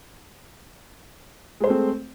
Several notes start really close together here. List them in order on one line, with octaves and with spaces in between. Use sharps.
G#3 C5 A3 C4